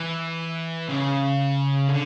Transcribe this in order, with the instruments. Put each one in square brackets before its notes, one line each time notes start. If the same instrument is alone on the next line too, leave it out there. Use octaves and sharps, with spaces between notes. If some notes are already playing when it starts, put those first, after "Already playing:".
Already playing: [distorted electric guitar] E3
C#3
D3